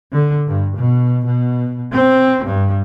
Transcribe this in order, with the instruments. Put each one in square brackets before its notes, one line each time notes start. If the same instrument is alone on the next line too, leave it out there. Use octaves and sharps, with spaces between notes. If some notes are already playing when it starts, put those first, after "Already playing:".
[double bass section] D3
G2
B2
B2
C4
G2